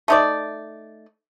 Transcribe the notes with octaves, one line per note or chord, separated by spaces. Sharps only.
A3 D#4 D5